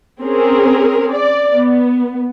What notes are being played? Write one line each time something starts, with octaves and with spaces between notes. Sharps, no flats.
C4 C#4 G#4 A#4
D5
B3